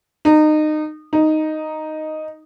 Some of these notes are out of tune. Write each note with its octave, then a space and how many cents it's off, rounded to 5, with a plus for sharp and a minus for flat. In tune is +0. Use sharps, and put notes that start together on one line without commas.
D#4 -25
D#4 +0